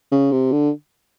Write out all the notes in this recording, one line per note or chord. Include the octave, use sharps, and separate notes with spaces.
C#3
C3
D3